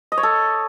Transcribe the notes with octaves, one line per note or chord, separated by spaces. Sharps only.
D#5
C#5
A4